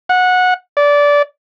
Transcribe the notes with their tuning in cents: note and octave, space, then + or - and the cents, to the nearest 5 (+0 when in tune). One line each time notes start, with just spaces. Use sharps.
F#5 -15
D5 -20